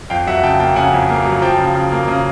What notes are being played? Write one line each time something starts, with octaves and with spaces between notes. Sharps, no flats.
F2 F5 G5
F#3 E5 F#5
C#3 G5 A5
A#3 G5 A5
C#3 F#5 G#5
F2
A#3
F#3
F3 G5 A5
C#3
C#3
A#3
C#3